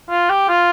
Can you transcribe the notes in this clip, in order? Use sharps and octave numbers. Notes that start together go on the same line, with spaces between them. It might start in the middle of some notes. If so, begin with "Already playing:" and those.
F4
G4
F4